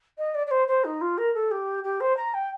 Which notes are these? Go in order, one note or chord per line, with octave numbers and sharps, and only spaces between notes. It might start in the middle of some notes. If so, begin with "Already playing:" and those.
D#5
D5
D5
C5
C5
D#4
F4
A#4
A4
G4
G4
C5
A#5
G5